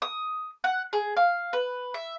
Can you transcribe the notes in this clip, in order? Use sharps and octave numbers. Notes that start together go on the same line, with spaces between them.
D#6
F#5
G#4
F5
B4
E5